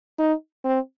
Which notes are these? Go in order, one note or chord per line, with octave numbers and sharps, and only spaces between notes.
D#4
C4